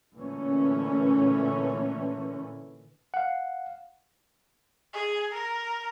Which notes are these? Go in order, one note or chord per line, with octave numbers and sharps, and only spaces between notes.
A#2 D3 E3 A3 C#4
F5 F#5
G#4
A#4